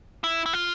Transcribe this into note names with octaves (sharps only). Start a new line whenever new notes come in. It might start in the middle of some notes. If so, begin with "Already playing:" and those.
E4
E4
F4